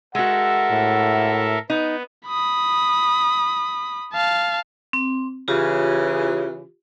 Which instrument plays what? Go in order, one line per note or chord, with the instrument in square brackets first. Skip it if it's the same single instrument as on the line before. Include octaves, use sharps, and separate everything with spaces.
[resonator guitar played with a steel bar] G#3 F#4 [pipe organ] A4 A#4 E5 [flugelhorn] F#5
[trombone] A2
[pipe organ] B3 [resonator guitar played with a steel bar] D#4
[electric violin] B5 D#6
F5 A5
[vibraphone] C4
[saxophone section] C#3 E3 [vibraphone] F4 G4